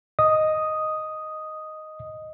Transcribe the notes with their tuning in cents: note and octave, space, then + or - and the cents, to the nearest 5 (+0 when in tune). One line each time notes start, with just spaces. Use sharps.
D#5 +0 D#6 +0